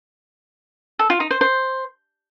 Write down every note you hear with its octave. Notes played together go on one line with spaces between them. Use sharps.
A4
F4
D#4
C5
C5